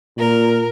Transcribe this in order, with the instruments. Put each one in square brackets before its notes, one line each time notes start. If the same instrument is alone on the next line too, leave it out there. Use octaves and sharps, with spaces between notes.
[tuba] A#2 [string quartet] A#4